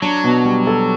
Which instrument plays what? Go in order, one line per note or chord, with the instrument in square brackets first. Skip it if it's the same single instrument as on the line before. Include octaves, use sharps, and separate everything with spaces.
[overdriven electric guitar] F#3 [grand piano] D4
[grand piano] B2
G3
A4